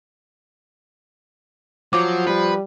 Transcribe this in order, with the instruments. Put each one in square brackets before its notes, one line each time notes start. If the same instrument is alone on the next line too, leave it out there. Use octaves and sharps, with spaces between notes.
[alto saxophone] F3 [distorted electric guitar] F#3 [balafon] D6
[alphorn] G3 [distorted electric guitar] B4